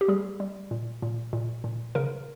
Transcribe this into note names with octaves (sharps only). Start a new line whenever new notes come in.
G4
G3 G#4
G3
A#2
A#2
A#2
A#2
C#3 A#4